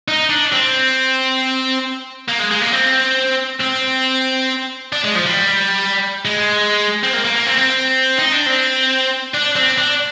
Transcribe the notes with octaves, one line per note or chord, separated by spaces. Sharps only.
D#4
D4
C4
A#3
G#3
G#3
A#3
C4
C4
D4
G#3
F3
G3
G#3
C4
A#3
A#3
A#3
C4
C4
D#4
D4
C4
D4
C4
D4